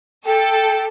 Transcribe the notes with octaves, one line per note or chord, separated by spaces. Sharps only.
A4 G5